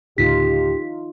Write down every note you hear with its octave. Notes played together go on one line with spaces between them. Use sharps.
D2 A2 C#3 D#4 F4 G4 B6